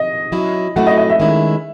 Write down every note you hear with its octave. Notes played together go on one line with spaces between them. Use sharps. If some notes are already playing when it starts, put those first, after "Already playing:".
Already playing: D#5
F#3 C#4 E4
F#3 A3 C#4 E4 F#5
D#5
D#5
E5
D#3 G#3 C#4 E4